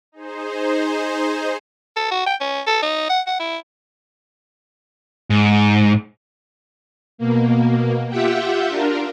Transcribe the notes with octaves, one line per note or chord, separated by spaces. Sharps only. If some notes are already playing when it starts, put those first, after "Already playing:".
D#4 G#4 C5
A4
F#4
G5
C#4
A4
D#4
F#5
F#5
E4
G#2
B2 A#3
F4 G4 E5 F#5 G5
D4 F4 A#4